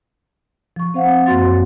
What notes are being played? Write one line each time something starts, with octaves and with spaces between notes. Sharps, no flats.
F3 C#6
C4 C5 F5 F#5
F#2 A#3 F#4 C6 A6